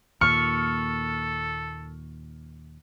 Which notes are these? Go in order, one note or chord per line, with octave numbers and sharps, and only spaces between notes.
D#2 A#2 A4 C#6 F6